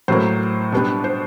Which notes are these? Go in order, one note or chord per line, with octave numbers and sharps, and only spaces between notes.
A2 F#3 A#3 C5
B2 G3 B3 D4
C5